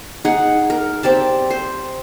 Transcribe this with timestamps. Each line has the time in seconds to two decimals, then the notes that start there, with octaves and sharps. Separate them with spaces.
0.25 D#4 G#4 F#5
0.70 A#4
1.03 C4 G4 D5 A5
1.50 C5